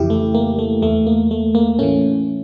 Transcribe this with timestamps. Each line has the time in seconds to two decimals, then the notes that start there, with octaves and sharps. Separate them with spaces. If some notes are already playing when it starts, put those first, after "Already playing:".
Already playing: F2 C#3 E3 E4 G4
0.10 A3
0.35 A#3
0.59 A3
0.82 E2 E3 A3
1.07 A#3
1.31 A3
1.55 A#3
1.79 A2 E3 A3 C#4